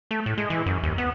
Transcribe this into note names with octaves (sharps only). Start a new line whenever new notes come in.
A3
A2
G#3
E3
F#2
D#2
B3